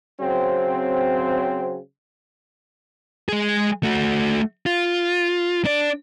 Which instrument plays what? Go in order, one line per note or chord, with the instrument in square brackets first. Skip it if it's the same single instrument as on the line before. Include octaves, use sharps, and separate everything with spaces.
[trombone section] C#3 F#3 C4
[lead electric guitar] G#3 G#4
A3 F#4
F4
D4 D5